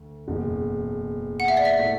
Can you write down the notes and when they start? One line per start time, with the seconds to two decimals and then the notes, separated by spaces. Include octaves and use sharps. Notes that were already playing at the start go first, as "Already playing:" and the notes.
Already playing: D2
0.28 F#1 E2 B2
1.40 F#5
1.48 E5
1.57 D5
1.65 E5
1.79 A2 A3